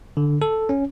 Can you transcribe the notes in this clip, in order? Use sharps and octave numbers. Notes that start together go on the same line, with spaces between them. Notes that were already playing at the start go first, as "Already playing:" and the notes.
D3
A4
C#4